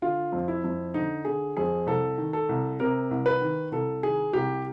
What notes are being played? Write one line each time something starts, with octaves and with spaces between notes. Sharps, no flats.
D3 F4
F2
E4
F2
D3 D#4
D3 G#4
F2 G#4
C2 A4
D#3
A4
C2
C3 A#4
C2
B4
D#3
C2 A4
D#3 G#4
C2 G4